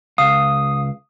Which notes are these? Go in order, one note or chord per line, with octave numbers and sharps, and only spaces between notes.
C#2 F5 D#6